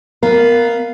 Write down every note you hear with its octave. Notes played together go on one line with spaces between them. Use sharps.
B3 A#4 F5